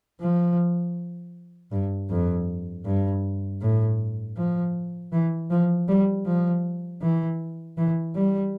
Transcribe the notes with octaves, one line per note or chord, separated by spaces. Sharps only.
F3
G2
F2
G2
A2
F3
E3
F3
G3
F3
E3
E3
G3